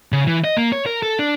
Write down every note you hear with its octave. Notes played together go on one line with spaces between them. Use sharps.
C#3
E3
D#5
A#3
C#5
A#4
A4
D4